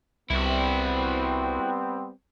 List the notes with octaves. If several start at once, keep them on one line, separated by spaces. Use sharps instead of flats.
C2 G3 B3 C4 E4 F#4